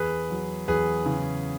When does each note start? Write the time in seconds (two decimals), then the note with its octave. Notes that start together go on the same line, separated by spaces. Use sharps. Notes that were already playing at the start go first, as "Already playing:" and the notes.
Already playing: E2 G#4 B4
0.30 F#3
0.68 E2 G#4 B4
1.06 C#3